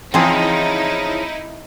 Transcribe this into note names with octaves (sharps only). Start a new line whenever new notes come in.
C#3 E3 F3 C4 D#4 E4 G#4